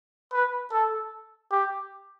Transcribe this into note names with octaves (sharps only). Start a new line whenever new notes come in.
B4
A4
G4